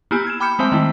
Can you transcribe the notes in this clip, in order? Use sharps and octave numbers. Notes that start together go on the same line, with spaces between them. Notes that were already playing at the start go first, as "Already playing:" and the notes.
A#3 B3 E4 G4 G#5
G#6 E7
G5 B5 D6 F6 G6 C#7
G#3 A3 C4 C5 E5
D#3 G3 A3 E4